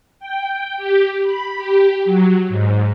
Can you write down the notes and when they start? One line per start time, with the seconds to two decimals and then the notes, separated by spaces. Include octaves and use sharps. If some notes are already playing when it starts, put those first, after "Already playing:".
0.19 G5
0.77 G4
1.23 B5
1.57 G4
2.05 F#3
2.49 G#2